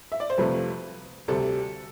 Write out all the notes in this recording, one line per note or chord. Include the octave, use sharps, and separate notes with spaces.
E5
D5
C5
F2 C3 F3 A3 B4
D2 C3 G3 A4